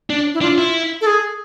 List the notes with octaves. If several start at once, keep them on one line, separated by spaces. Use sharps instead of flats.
D4
E4
D4 F4
E4
A4
G#4